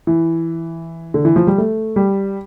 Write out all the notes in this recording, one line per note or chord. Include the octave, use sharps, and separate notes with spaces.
E3
D3
E3
F3
G3
A3
G3